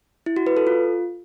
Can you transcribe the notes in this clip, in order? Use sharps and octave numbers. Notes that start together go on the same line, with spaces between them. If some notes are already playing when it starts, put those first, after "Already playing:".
E4
F#4
B4
A4
F4